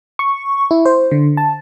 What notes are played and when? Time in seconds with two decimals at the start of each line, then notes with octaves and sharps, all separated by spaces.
0.19 C#6
0.71 E4
0.86 C5
1.11 D3
1.37 A5